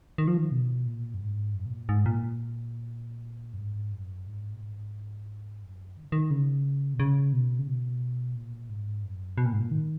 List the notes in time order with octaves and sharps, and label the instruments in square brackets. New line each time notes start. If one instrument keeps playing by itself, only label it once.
[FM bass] D#3
F3
D#3
B2
A#2
F#2
G#2
F#2
B2
A#2
G#2
A#2
F#2
G#2
F#2
G#2
A#2
G#2
F#2
D#3
C#3
D#3
C#3
B2
C#3
B2
C#3
B2
A#2
G#2
F#2
B2
A#2
G#2
A#2
D#3